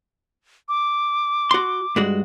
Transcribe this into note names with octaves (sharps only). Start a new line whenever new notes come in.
D6
F#4 C6
G2 G#3 F#4